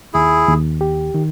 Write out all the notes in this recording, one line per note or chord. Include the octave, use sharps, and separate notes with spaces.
D#2 E4 G#4
D#2
G4
D#3